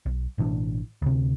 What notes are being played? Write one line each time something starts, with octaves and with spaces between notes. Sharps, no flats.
B1
A1 B2 E3 D4
D2 C3